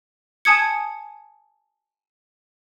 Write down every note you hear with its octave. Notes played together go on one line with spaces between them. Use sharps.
G#5 A5 D#6 G#6 C#7